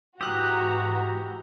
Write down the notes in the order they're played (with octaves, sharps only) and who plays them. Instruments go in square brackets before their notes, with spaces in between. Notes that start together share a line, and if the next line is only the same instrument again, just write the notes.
[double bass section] G#2 E3 [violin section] F#4 A#5 [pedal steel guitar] G4 [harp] D#6 F#6